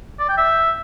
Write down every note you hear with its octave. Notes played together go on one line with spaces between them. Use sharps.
D5
G5
E5